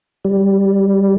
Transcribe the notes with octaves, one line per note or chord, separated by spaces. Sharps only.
G3